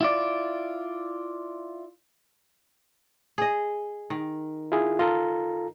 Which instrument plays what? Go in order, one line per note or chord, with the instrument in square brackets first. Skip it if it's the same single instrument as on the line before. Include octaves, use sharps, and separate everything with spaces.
[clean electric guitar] E4 F4 D5
[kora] G#4 D#5
D#3
[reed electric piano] E4 F4 G#4
[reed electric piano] F4 A4 A#5 [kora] D#5